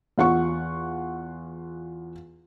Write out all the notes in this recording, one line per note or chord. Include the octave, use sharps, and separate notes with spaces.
E2 F4 F#5 C#6